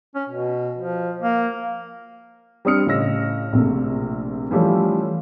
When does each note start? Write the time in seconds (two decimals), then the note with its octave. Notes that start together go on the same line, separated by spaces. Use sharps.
0.15 C#4
0.29 B2
0.78 F3
1.22 A#3
2.65 G3 C4 D4 D#6 F6 C#7
2.86 A2 C#3 D#5 E6 A#6
3.53 A#1 C3 A3
4.51 E3 F3 G3 A3 C#4